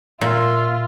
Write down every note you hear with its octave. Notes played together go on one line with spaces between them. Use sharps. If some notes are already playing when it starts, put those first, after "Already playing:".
A#2 F4 E5